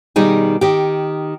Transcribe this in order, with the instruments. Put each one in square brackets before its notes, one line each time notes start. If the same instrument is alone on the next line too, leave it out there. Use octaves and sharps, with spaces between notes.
[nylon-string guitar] B2 D#3 G3 D#4 G#4
D#3 G4